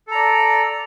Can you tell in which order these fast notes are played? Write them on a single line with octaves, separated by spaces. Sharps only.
A4 A#5 D5